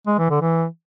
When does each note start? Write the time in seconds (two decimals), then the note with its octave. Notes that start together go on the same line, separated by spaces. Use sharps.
0.07 G#3
0.18 E3
0.30 D3
0.42 E3